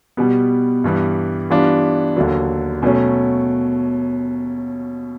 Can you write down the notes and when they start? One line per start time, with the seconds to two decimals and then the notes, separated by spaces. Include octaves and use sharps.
0.17 B2 G3 B3
0.84 G2 E3 G3 B3
1.50 E3 G3 B3 D4 F4
2.16 D#2 D3 F#3
2.83 B2 F#3 A3 C#4